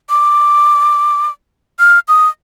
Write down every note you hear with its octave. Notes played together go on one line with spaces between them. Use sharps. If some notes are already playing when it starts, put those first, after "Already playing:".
D6
F6
D#6